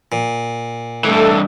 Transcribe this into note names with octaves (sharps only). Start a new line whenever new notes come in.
A#2
G2 E3 A3 A4